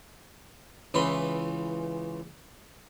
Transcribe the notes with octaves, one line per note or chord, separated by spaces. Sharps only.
C#2 C#3 E3 B4 B5 C6